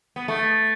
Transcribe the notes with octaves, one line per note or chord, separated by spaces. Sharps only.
B3
A3